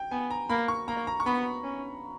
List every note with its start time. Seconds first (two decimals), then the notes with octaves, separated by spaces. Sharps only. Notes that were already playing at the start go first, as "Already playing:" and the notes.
Already playing: G5
0.11 B3 G#5
0.31 A#5
0.49 A#3 B5
0.68 C#6
0.88 A#3 A#5
1.07 A#5
1.20 C#6
1.26 B3 B5
1.64 C#4